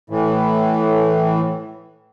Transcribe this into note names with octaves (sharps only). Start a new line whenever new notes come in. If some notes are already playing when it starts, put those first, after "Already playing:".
A2 E3